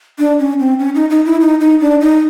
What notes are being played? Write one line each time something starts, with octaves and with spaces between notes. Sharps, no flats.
D4
C#4
C4
C#4
D#4
D#4
E4
D#4
D#4
D4
D#4